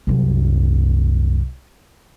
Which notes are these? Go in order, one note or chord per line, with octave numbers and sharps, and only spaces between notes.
C2 F#2